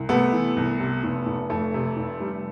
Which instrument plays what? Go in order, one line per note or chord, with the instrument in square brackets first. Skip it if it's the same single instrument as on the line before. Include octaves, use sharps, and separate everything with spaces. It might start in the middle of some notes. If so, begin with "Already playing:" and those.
Already playing: [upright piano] C2
C3 A3 B3
E3
C2
C3
F1
F1
F2 A3
C3
F1
G3